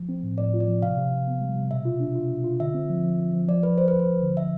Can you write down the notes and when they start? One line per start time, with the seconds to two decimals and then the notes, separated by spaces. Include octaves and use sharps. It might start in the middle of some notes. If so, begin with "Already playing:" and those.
Already playing: F3
0.09 C4
0.23 A2
0.38 A2 D5
0.54 F4
0.60 D5
0.68 F3
0.82 C3 F5
0.97 C3
1.12 C3
1.27 B3
1.42 G3
1.56 C3
1.71 B2 E5
1.85 F4
2.00 D4
2.15 F4
2.29 B2
2.44 F4
2.60 D3 E5
2.74 C4
2.90 F3
3.03 F3
3.18 F3
3.34 F3
3.49 F3 D5
3.63 F3 B4
3.77 D2 C5
3.88 D2 B4
3.99 C5
4.08 D2
4.22 D3
4.37 E5